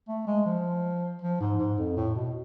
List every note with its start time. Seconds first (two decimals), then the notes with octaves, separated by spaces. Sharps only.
0.08 A3
0.27 G#3
0.46 F3
1.22 F3
1.41 G#2
1.59 G#2
1.78 F2
1.97 A2
2.15 B2